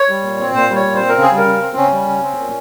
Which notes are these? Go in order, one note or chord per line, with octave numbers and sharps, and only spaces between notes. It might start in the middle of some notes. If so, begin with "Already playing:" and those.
Already playing: C#5
G3
A#2
C4
A#2 C5
G3
C#5
A#2
C4 C5
A#4
C#3
G#4
G3
A#4
C#3
C4
C#3 C#4
G3
C#3
C4
A#2